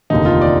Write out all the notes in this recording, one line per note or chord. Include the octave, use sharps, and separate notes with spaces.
F1 D#2 D3 D#4
F4
D5